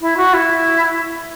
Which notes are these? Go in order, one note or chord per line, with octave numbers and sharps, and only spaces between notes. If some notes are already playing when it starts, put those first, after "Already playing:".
E4
F#4
E4